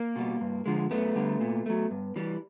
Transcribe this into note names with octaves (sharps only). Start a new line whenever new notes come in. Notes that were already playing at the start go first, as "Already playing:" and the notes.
Already playing: A#3
B2 G3
G2
D3 F3 G#3
F#2 A3 B3
D3 G3
A#2
F#3 A3
G2
E3 G3